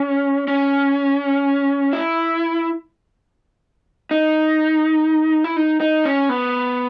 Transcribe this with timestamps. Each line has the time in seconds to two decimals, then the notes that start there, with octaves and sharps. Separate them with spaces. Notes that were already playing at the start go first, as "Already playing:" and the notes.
Already playing: C#4
0.48 C#4
1.93 E4
4.11 D#4
5.44 E4
5.56 D#4
5.81 D#4
6.05 C#4
6.29 B3